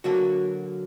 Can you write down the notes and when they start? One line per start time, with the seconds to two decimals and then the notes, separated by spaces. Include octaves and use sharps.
0.04 D3 F#3 A#3 F#4